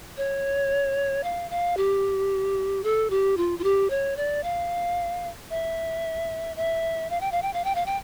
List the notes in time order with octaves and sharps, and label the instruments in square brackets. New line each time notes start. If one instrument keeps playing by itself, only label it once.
[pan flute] C#5
F5
F5
G4
A4
G4
F4
F4
G4
C#5
D5
F5
E5
E5
F5
G5
F5
G5
F5
G5
F5
G5